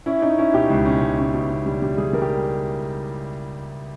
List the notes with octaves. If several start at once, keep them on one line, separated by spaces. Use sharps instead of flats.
C#4 E4
C#4 D#4
C#4 E4
B2 G4
C#2
C#4
C#2
C#4
B2
B2
G3
G3
G3 G#4
G3 A#4
G4